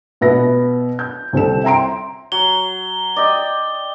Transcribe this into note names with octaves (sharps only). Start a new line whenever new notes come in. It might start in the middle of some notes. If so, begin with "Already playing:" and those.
B2 B3 E5 A#6
G6
C2 C4 A4 E7
E5 G5 A#5 C6 D7
F#3 G7
D5 D#5 G5